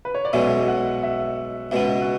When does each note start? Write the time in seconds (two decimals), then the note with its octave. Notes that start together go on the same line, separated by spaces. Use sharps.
0.05 B4
0.15 C#5
0.25 D5
0.33 B1 B2 G#3 C#4 E5
0.68 F#5
1.03 E5
1.71 C#2 B2 G#3 B3 E5
2.01 F#4